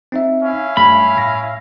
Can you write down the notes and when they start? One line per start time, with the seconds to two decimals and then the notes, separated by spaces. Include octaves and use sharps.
0.12 C4 D#4 E5
0.43 C#4 E4 F5
0.77 G2 G3 A3 B5
1.17 A2 A#6